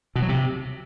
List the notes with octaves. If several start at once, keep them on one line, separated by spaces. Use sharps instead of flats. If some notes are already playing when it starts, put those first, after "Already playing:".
B2
F#3
C3